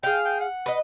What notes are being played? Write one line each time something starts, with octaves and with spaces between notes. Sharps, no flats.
G#4 F5 G5
G5
F#5
B4 D#5